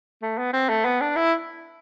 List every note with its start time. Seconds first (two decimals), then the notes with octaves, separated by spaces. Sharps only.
0.22 A3
0.38 B3
0.53 C4
0.69 A3
0.85 B3
1.01 D4
1.16 E4